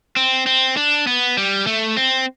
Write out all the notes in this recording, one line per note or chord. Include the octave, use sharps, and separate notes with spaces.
C4
C4
D4
B3
G3
A3
C4